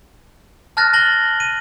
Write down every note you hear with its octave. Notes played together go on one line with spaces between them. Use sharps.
A5 F6 F#6 A6 A#6
A5 A6 A#6 F#7 G7
D#7